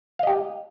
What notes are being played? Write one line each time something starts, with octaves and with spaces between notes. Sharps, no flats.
G4 D#5 F5